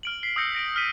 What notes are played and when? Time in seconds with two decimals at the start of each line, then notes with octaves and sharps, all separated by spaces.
0.03 F6 D7 F#7
0.23 B6 C7
0.36 D#6 E6 G6 A#6 C#7
0.55 A#6 D7 F#7
0.76 F6 B6 D#7